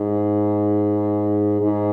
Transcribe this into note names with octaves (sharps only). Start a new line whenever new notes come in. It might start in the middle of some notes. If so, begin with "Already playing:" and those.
Already playing: G#2
G#2